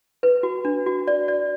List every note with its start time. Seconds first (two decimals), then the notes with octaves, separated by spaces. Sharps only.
0.23 B4
0.43 F#4
0.65 D4
0.86 F#4
1.08 D5
1.28 D5